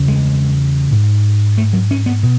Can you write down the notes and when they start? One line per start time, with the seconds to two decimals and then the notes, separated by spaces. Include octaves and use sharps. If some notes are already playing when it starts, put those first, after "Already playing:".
Already playing: E2 C#3
0.08 G#3
0.92 G#2
1.58 A3
1.73 F#3
1.91 C#4
2.06 B3
2.23 B2